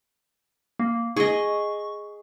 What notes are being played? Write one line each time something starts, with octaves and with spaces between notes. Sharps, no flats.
A#3
G#4 D#5 C#6